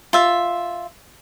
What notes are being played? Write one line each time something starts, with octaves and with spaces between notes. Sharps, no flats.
F4 E5